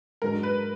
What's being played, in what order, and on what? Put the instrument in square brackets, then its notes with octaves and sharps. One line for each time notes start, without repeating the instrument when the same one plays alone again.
[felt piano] G#2 F#3 D4 [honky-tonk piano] A#4
[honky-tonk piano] B4